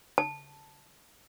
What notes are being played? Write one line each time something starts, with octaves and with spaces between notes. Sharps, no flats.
A5